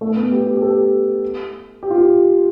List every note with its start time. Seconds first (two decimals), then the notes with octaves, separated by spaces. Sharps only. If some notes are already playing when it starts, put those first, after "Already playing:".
0.01 A3
0.16 B3
0.31 G4
0.47 G4
0.57 G4
0.62 A4
1.83 G4
1.91 F4
1.98 G4